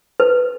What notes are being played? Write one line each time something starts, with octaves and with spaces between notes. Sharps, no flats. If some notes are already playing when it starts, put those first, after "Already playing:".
B4